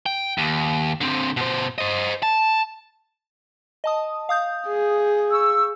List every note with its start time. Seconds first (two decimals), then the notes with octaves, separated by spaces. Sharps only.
0.06 G5
0.38 D#2
1.01 D3 C4
1.37 B2 C5
1.78 C5 D#5
2.23 A5
3.84 D#5 A5 D#6
4.29 F5 D#6 G6
4.68 G#4
5.31 C#6 E6